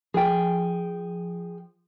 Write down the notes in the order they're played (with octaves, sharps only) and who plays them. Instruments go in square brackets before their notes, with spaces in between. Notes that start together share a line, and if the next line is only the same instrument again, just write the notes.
[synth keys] F3 [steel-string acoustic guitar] G#4 G5